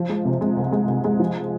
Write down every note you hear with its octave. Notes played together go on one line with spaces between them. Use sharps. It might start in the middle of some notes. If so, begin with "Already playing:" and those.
Already playing: F3
G#3
C3
G#3
C2
G#3
C2
G#3
F3